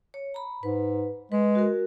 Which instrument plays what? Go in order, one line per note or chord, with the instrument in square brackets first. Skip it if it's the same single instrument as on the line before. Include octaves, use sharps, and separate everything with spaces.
[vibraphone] C#5
A#5 B5
[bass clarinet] G#2 [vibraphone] B4
[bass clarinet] G#3 [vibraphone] B4
[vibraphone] F#4 A#4